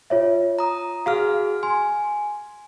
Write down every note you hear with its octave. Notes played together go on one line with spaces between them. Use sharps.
F4 C#5 E5
A#5 D#6
F#4 G#4 F5 F6
G#5 C6